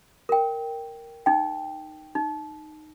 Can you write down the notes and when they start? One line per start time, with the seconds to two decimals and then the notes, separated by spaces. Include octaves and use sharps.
0.29 A#4 G5
1.26 D#4 G5
2.15 D#4